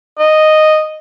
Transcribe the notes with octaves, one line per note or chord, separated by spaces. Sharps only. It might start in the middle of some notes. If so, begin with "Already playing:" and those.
D#5